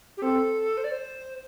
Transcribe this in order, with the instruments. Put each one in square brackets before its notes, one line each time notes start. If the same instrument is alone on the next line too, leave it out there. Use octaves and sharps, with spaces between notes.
[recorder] G4
[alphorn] C4 [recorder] A4
[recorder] C5
D5
C5